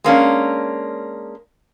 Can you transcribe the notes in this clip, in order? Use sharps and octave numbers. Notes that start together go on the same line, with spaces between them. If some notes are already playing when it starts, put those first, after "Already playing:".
G#3 A#3 C#4 D4